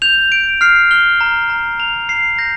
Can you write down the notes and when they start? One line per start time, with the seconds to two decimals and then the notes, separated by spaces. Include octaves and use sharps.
0.02 G6 F7
0.32 G6 D7
0.61 F6 C7
0.91 F6 G7
1.21 A#5
1.50 A#5
1.79 A#5 F7
2.09 A#5 C7
2.38 G6 A#6